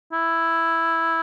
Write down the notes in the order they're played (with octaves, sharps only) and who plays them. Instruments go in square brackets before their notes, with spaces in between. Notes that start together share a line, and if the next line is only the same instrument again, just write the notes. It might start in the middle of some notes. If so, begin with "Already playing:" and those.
[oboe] E4